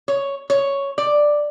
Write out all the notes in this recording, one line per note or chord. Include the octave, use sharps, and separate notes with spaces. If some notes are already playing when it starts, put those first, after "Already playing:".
C#5
C#5
D5